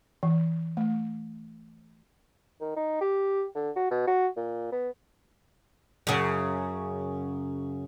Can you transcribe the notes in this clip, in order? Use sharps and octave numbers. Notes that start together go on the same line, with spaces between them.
E3
A3
D#3
D#4
G4
D3
F#4
B2
F#4
A#2
B3
F#2 C#3